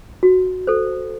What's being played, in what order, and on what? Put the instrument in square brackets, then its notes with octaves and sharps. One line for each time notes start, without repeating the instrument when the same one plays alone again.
[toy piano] F#4
A4 C5